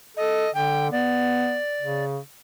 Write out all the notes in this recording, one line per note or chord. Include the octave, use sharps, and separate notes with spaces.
A4 D#5
D3 G5
B3 D5
C#3